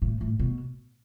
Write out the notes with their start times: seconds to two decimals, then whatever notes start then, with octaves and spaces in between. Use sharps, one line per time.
0.02 A2
0.21 A2
0.39 B2